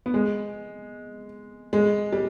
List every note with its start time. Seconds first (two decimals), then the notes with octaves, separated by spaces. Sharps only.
0.06 B3
0.14 G#3
1.73 G#3
2.13 G3